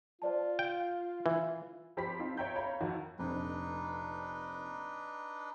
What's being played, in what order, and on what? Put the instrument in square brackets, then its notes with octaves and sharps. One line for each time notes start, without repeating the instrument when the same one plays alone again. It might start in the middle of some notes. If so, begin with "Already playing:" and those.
[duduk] F4 [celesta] C5 D5 A5
[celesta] F5 [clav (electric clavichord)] G5
[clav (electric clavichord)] E3 [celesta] E5
[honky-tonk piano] F3 G4 C5 B5 B6
C4 D#4 F4
C#5 E5 G5 A#5 G6
C#5 F5 A#5 B5
F2 D#3 F#4
[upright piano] F1 A#1 F2 [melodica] D4 D#4 B4